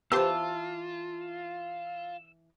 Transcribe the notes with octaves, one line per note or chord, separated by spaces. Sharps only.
E3 B3 F4 G4 C5 A5 E6